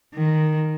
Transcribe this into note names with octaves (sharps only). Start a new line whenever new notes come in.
D#3